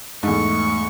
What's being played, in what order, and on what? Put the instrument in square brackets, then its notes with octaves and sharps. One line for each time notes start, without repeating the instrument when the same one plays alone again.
[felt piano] E2 G#2 [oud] A3 [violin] C#6